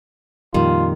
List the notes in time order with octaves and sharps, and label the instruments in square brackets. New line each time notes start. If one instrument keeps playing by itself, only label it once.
[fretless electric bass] F2 A#2 G3 [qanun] D#3 [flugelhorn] F4